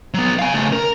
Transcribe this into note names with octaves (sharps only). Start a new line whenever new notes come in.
F#3 B3
F5 G#5
C#3 A3
A#4